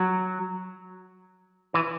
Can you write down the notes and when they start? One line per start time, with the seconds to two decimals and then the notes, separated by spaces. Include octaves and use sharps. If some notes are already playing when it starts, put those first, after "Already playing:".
Already playing: F#3
1.74 E3